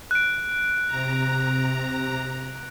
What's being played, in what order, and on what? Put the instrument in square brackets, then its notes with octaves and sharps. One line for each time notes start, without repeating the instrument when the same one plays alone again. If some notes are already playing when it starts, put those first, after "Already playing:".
[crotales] F#6 D7
[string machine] C3 A#5